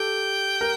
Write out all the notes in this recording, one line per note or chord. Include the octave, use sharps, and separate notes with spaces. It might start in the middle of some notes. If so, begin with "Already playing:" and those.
Already playing: G4 A4 G5
A#4